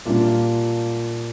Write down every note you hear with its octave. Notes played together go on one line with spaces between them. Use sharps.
A#2 G3 A#3 D4 F4